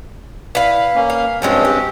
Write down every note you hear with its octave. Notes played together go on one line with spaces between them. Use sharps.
E4 B4 F5
A#3 C#4
F5
G2 F3 F#3 G#3 C4 C#4
G4